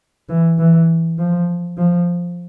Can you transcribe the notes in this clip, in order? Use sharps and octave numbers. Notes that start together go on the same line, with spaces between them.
E3
E3
F3
F3